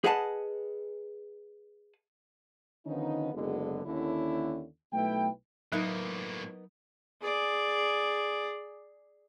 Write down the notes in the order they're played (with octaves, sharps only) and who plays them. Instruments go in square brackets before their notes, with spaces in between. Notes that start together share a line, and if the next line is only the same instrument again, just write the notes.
[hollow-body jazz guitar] G#4 B4 D#5 F#5 G#5 A5
[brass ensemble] D3 D#3 F3 B3 C#4 D#4
F#1 D3 G#3 B3
D#2 D3 C#4 E4
B1 A3 E4 B4 G5
[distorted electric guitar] A2 A#3 [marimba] F#3 [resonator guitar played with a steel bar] B3 D#4 A#4
[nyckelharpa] G#4 D5